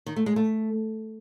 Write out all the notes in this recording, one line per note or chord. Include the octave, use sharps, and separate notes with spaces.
D#3
A3
G#3
A3